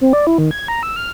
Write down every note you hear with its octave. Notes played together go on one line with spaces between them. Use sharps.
C4
D5
E4
D#3
G#6
A#5
E6
F6